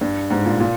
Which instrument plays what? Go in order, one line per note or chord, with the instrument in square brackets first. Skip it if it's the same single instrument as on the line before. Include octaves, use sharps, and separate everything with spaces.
[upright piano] G2
G#2
A#2
A#2